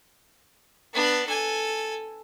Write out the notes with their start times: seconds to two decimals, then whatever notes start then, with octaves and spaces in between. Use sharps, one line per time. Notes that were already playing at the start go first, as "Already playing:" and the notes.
0.93 B3 D4
1.27 A4 G#5